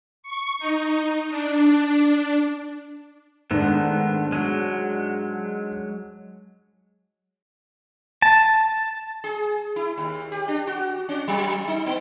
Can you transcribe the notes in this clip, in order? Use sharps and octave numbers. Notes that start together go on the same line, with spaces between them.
C#6
D#4
D4
G#2 D#3 A3 B3 D4
F#3 G#3
A5
G#4
E4
D#2
G4
D4
F#4
C#4
F#3
D#4
B3